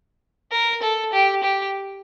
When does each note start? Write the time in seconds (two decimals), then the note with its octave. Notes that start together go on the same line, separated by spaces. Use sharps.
0.52 A#4
0.82 A4
1.13 G4
1.43 G4